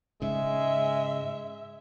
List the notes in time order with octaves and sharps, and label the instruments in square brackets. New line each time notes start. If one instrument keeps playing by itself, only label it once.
[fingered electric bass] G#2 C#3 [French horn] G#3 [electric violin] E5